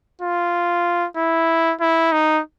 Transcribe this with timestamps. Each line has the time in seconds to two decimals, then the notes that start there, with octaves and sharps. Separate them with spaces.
0.22 F4
1.17 E4
1.81 E4
2.12 D#4